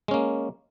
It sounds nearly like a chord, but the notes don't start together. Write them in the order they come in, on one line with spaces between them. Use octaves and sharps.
G#3 C#4 A#3